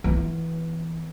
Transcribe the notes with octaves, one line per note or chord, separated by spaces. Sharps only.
E3 B3